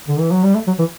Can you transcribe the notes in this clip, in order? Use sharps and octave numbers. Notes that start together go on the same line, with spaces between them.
D3
E3
F#3
G3
A3
F#3
E3